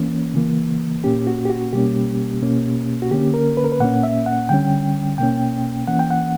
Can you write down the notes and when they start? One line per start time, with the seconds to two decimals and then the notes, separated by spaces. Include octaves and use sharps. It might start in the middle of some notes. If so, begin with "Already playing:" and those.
Already playing: E3 A#3 C#4
0.34 C#3 E3 A#3
1.04 A#2 A#3 C#4 G4
1.27 F#4
1.45 G4
1.50 F#4
1.73 B2 G3 A#3 C#4 G4
2.42 B2 A#3 C#4
3.02 F#4
3.11 D3 A#3 C#4 G4
3.34 A#4
3.57 B4
3.64 A#4
3.72 B4
3.80 A#2 A#3 C#4 F#5
4.03 E5
4.26 F#5
4.49 D3 G3 C#4 G5
5.18 B2 A#3 C#4 G5
5.88 E3 A#3 C#4 F#5
5.99 G5
6.11 F#5